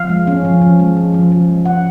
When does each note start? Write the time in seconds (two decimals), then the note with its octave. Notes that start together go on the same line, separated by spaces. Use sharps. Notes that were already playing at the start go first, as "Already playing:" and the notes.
Already playing: F3 F5
0.09 G#3
0.27 C#4
0.45 F3
0.62 F3
0.79 G#3
0.97 C#4
1.14 F3
1.32 F3
1.49 G#3
1.65 C#4 F#5